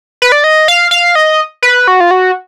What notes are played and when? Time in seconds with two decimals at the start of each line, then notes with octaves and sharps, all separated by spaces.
0.22 B4
0.32 D5
0.44 D#5
0.68 F5
0.91 F5
1.15 D#5
1.63 B4
1.88 F#4
2.00 F4
2.11 F#4